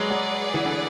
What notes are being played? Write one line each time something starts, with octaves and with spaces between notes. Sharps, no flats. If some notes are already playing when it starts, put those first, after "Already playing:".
Already playing: F#3 G#3 G#4 B4 D5 F#5
F#3
E3
D3